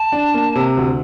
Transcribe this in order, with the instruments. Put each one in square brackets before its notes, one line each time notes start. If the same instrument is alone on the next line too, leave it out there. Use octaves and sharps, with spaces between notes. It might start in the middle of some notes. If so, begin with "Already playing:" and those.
Already playing: [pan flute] A5
[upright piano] D4
A#3
C3
D2